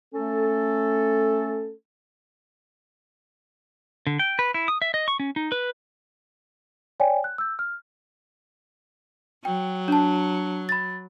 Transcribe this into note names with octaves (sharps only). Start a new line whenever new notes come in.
A3 C#4 A4
D3
G5
B4
E4
D#6
E5
D#5
C#6
C#4
D#4
B4
C#5 D5 G5 G#5
F#6
E6 G6
F6
F#3 G5
D4 A5
B5 A6